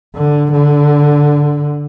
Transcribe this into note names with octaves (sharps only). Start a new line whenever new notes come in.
D3
D3